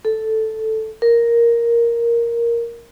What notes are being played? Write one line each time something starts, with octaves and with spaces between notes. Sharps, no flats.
A4
A#4